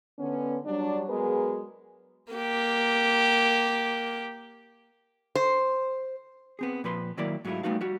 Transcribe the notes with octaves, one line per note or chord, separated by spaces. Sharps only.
D3 B3 C#4
F#3 G3 D4
F#3 G#3 B3 G#4 A#4 B4
A#3 G4
C5
B3 C4 G#4
A#2 F3 B4 C6
D#3 F#3 A#3 E4 D5
G#2 F#3 A3 C#4 E4 F4
G3 A3 B3 D#4 F#4 F5
G3 F#4